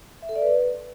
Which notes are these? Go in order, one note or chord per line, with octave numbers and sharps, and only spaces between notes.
E5
A4
D5
B4